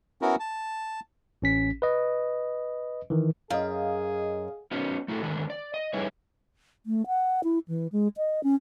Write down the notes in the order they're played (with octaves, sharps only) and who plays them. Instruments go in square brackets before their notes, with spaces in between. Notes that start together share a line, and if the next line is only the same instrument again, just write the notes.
[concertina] B3 C#4 E4 F#4 A#4
A5
[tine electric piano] A1 C#4 B6
B4 D#5
D#3 E3
[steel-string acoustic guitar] F#2 [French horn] G#4 [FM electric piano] D#5 F5
[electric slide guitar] B3 C#4 D#4 F#4
A3 E4 F#4 A4
D3 D#3 G#3 D4
D5
D#5
G3 D#4 E4 G#4 B4 C#5
[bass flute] A3
F#5
E4
E3
G#3
D#5
C#4